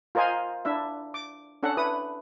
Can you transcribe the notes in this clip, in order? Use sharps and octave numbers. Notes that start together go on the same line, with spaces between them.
F4 A#4 C5 D#5 G#5
D4 E4 E5
D6
C#4 D4 A4 F#5
E4 B4 D#6